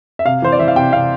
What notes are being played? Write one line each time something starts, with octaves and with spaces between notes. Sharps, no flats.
E5
C3 F5
E3 C5
D5
E3 E5
F5
C3 G5
C3 F5